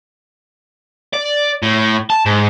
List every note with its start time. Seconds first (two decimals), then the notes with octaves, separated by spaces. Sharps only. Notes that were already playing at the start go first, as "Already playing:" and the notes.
1.13 D5
1.63 A2
2.10 A5
2.26 G#2